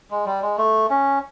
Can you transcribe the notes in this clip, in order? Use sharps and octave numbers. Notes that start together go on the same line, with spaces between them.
G#3
G3
G#3
A3
C#4